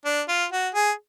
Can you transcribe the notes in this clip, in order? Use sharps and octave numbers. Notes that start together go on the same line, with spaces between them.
D4
F4
F#4
G#4